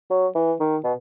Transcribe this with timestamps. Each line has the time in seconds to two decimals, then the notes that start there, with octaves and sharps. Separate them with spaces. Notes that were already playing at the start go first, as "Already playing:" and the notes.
0.10 F#3
0.35 E3
0.60 D#3
0.84 B2